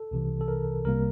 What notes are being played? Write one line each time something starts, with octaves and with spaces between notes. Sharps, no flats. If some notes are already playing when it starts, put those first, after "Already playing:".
Already playing: A4
C2 C3 E3
A4
A#4
C2 C3 G3 A#3 A#4